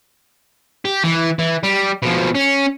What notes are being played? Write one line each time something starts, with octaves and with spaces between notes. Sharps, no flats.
G4
E3
E3
G3
B2 F3
C#4